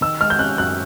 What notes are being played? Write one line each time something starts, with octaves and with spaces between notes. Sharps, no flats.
D#3 E6
G#3 F6
G6
C#4 F#6
F#2 F#6